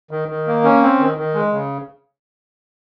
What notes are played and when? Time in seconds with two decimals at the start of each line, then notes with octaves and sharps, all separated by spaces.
0.11 D#3
0.28 D#3
0.47 A#3
0.64 C#4
0.82 C4
0.99 D#3
1.18 D#3
1.34 G#3
1.53 C#3